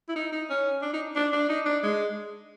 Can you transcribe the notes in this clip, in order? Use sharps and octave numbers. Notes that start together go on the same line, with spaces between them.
E4
D#4
D#4
C#4
D4
D#4
D4
D4
D#4
D4
G#3